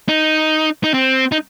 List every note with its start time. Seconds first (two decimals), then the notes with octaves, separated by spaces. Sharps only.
0.08 D#4
0.84 D#4
0.94 C4
1.32 D#4